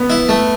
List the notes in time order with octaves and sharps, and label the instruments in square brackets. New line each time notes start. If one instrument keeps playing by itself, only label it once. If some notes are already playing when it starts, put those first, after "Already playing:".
Already playing: [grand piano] B3 B4
[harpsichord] E4
A3